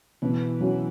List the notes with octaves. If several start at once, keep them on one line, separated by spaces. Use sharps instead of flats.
B2 E3
F#3 C#4 F#4